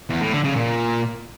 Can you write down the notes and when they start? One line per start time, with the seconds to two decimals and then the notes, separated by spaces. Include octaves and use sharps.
0.09 E2
0.21 A2
0.32 D3
0.44 C#3
0.55 A#2